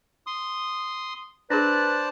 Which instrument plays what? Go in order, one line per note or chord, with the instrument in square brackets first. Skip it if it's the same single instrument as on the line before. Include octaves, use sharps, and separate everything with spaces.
[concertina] C6 D#6
[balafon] D4 G#4 [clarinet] B4 [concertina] C5 D5 A5